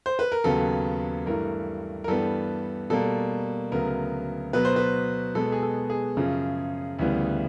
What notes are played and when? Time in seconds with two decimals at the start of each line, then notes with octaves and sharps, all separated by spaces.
0.06 C5
0.19 B4
0.32 A#4
0.44 D#2 C#3 F#3 B3 A4
1.26 G2 E3 A3 A#4
2.04 A#4
2.08 G2 E3 G3 B3 A4
2.90 B2 G3 A#3 A4
3.72 D2 C#3 F#3 B3 A#4
4.53 B2 F#3 B3 B4
4.65 C5
4.76 B4
5.35 B2 G#3 B3 A4
5.52 G#4
5.62 A4
5.90 G#4
6.17 F#2 C#3 F3
6.99 D2 C#3 E3 G3 B3